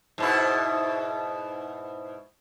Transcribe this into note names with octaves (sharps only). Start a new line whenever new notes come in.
G#2 B2 E4